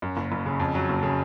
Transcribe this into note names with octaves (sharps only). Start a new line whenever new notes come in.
F#2
F#1
F#1
C#3
F2
F#3
F#1
C#3